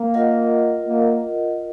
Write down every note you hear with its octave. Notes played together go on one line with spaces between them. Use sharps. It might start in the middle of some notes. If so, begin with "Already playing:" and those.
Already playing: A#3
F4 A#4 D#5 F#5
A#3